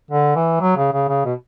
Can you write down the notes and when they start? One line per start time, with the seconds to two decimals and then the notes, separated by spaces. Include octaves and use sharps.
0.11 D3
0.36 E3
0.61 F#3
0.77 C#3
0.93 C#3
1.08 C#3
1.25 B2